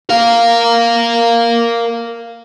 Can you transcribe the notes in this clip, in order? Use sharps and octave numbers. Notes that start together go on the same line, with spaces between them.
A#4 F5